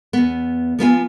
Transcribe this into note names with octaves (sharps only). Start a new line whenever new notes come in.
E2 B3
F3 B3 F4 G#5